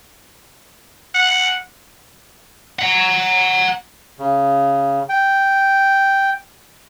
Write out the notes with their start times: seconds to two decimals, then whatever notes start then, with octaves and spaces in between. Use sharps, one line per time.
1.15 F#5
2.79 F#5 A#5
4.19 C#3
5.09 G5